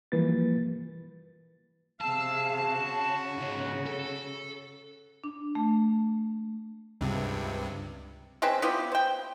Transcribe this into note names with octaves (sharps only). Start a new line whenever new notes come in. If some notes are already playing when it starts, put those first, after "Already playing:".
E3 F3 G3 A#3 B4 A6
C3 G#4 F5 A5 E6
F#4
C#3
C#2 G#2
A4
D4
A3
C#2 G2 C3
G#3 C4 C#4 B4
B3 E4 F4 G4
C5 G5